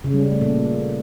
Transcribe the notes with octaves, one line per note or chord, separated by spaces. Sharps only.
C#3
G3
C#3
A3
A#2